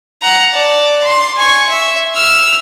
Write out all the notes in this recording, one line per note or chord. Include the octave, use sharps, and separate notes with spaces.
F#5 A#5
D5 A5
C6
G#5 C#6
E5
E6 F6